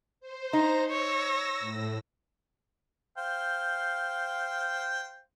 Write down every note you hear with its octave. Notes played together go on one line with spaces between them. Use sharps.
C5
D#4 A#5
C#5 E6 A#6
A2
C5 F5 G5